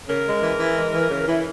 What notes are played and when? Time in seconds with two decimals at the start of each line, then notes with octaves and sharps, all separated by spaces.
0.08 C#3 A#4
0.26 G#3
0.42 E3
0.59 E3
0.76 G#3
0.94 E3
1.11 C#3
1.27 E3